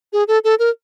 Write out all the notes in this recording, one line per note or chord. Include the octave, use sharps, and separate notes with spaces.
G#4
A4
A4
A#4